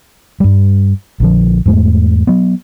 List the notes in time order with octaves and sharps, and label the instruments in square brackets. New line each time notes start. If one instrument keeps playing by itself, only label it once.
[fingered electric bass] G2 G3
A#1 D3 F3
E2 G#2 G#3 A3
F#3 B3